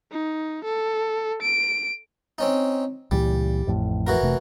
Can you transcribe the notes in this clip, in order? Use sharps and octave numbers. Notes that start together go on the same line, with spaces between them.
D#4
A4
D7
C4 C#4 D#4
C#2 A#2 E3 G3
A1 F2 A2
E3 F#4 A#4
F1 C3 A3